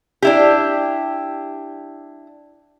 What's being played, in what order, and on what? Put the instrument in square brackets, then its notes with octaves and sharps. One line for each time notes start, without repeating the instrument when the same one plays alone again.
[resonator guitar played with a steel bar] D4 E4 G4